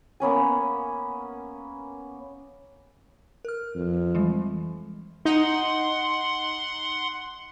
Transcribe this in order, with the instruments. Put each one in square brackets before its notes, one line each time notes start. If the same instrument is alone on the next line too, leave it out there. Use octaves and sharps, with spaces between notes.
[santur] A#3 B3 C#4 G#5
[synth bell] A#4 F6
[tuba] F2
[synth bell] E3 G3 G#3
[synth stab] D#4 [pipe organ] F#5 C6